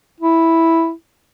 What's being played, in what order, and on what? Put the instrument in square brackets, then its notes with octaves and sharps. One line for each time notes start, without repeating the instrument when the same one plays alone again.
[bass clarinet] E4